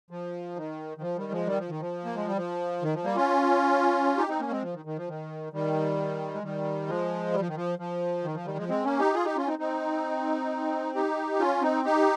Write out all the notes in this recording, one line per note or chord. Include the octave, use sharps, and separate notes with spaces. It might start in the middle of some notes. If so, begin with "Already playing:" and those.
F3
D#3
D#3
F3
D#3 G3
F3 G#3
D#3 G3
F3
D#3
F3
A#3
G#3
G3
F3
D#3
F3
G3 A#3
C#4 F4
D#4 G4
C4 D#4
A#3 C#4
G#3 C4
F3
D#3
D#3
F3
D#3
D#3 G3
G#3
D#3 G3
F3 G#3
G3
F3
D#3
F3
F3
D#3
F3
D#3 G3
F3 G#3
G#3 C4
A#3 C#4
D#4 G4
F4 G#4
D#4 G4
C#4 F4
C4 D#4
C4 D#4
D#4 G4
C#4 F4
C4 D#4
D#4 G4